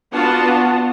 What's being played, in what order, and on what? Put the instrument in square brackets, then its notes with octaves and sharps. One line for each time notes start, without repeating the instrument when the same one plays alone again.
[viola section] B3 D4 F4 F#4 F#5 A5